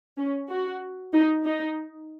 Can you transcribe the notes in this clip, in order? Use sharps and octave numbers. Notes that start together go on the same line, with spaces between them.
C#4
F#4
D#4
D#4